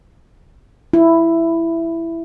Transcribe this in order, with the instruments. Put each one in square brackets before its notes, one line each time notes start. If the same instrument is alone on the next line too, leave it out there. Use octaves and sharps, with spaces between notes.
[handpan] E4